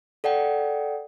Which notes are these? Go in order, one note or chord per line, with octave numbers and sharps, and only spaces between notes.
A4 D5 F#5 G5